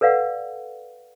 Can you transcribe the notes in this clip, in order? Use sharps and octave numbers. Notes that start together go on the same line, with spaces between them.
A4 B4 D5 F5 F#5